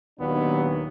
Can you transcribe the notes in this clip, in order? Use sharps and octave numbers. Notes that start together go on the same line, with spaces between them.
D#2 A#2 D#3 F#3 B3 D4